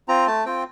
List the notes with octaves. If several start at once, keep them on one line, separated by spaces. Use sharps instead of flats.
C4 F4 A#5
A3 A5
C4 F4 G5